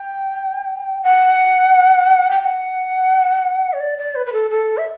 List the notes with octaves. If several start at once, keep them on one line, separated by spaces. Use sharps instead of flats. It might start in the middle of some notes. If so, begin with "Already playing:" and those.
Already playing: G5
F#5
G5
F#5
C#5
D5
D5
B4
B4
A4
A4
E5